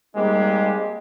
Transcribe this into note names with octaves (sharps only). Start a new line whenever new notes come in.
G3 G#3 A#3 C4 D#4 G4